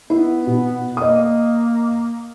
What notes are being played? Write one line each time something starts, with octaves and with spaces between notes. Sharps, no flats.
B3 E4
B2
A#3 D#5 D#6